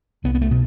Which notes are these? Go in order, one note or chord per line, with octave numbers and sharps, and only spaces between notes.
C2 B3
B3
A3
B2